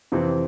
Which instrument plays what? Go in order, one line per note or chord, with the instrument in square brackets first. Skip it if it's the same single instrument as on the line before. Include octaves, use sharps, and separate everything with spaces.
[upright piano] F2 C3 E3 C4